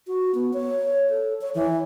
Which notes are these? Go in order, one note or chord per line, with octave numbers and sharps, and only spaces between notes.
F#4
B3
C#5
A4
C#5
E3